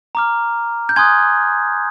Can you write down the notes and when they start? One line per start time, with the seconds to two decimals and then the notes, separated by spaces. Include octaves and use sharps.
0.15 A#5 D6 F6
0.89 G6
0.96 G#5 C6 D#6 F#6 G#6